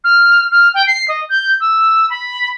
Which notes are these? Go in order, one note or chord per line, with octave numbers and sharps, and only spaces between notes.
F6
F6
G5
C7
D#5
G6
E6
B5